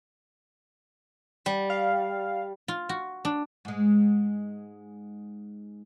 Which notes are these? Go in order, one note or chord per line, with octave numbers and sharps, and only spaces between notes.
G3
F5
F4
F#4
D4
G#2 G#3